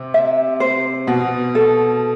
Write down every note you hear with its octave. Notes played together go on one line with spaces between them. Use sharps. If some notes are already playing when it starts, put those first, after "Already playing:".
Already playing: C3
E5
C5
B2 F#4
A4